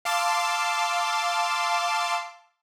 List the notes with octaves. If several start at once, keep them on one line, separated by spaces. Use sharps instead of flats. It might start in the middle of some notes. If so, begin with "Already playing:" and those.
F5 A5 C6 D6 E6